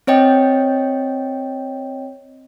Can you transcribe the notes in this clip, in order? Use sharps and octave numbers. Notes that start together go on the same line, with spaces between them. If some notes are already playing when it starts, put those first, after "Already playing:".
C4 C#5 D#5 G5